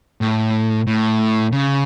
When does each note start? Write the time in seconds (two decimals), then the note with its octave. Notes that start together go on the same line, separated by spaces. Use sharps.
0.21 A2
0.87 A2
1.52 C#3